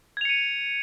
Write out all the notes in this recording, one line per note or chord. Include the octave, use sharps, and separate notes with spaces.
G#6 C#7 D#7 F7